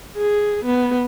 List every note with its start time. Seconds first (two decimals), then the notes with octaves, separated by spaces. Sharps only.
0.17 G#4
0.65 B3